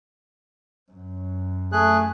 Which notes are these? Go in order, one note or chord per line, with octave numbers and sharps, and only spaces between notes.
F#2
A3 G#4 F#6